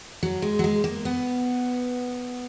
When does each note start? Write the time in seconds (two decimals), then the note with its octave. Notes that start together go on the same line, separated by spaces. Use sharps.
0.23 F#3
0.42 G#3
0.59 F#3
0.64 G#3
0.84 A#3
1.05 B3